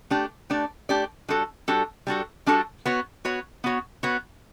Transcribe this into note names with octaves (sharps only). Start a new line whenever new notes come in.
A3 D4 G4 D5
A3 D4 G4 D5
A3 D4 G4 D5
G3 D4 F#4 A4
G3 D4 F#4 A4
G3 D4 F#4 A4
G3 D4 F#4 A4
B3 F#4 C#5
B3 F#4 C#5
B3 F#4 C#5
B3 F#4 C#5